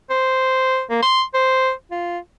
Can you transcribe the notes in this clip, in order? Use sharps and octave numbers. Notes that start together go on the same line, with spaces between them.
C5
A#3
C6
C5
F4